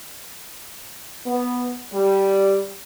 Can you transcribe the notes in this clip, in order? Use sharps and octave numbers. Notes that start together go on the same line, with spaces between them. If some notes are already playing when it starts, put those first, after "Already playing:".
B3
G3